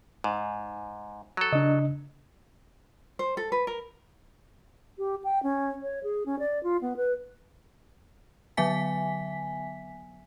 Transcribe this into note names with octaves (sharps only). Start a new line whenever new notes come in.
G#2
F#3 A4
C#3 D4 D#5
C5
A4
B4
A#4
G4
G5
C#4
C#5
G#4
C#4
D5
F4
B3
B4
D3 F#3 B3 E5 G#5 B6